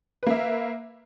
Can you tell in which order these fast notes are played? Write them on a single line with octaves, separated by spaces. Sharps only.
B4 A#3 E5